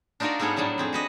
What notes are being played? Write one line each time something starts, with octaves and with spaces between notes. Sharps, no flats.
D4 D#4 F4 F#4 A#4 D5
G#2 G3 B3 G#4 A4 C#5
A2 F#3 G3 D4 A5
F2 C4 G#4
F#4 B4 D#5